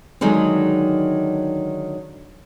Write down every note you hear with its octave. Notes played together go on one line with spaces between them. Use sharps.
D3 D#3 F#3 G#3 D#4